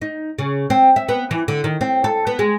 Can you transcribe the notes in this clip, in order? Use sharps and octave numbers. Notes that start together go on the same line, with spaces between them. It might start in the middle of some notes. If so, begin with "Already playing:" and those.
D#4
C#3
C4
E5
B3
E3
D3
D#3
C4
A4
B3
G#3